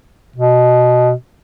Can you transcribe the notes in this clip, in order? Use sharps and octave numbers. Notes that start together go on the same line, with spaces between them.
B2